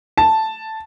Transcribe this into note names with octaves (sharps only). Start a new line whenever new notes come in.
A5